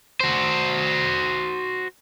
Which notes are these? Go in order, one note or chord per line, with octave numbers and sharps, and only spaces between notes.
F#4 C5